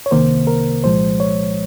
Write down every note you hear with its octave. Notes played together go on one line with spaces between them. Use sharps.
C#5
C2 C3 D#3 A#3 C5
A#4
C2 A#2 F3 G#3 C5
C#5